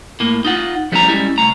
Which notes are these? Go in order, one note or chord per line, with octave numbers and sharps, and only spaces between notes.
A2 A#3
D#4 F4 F#5
F3 G3 A3 C#4 E4 A#5
G3 G#3 C#4 E4
C2 A3 A#5